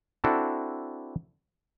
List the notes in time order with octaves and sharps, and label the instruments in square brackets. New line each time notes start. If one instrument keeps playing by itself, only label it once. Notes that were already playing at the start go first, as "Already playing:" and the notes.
[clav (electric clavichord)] C4 D4 E4 F#4 A4